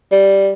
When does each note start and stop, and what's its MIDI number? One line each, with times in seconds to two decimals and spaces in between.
0.12 0.52 55